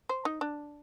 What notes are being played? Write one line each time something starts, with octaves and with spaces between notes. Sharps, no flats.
C5
D#4
D4